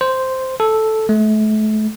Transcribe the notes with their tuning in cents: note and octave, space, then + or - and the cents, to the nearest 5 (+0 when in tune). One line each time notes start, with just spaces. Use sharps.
C5 -5
A4 -5
A3 -35